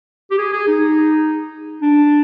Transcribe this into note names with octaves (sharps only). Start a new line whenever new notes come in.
G4
G#4
G#4
D#4
D4